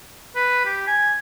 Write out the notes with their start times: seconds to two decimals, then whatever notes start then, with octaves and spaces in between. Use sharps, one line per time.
0.35 B4
0.65 G4
0.87 G#5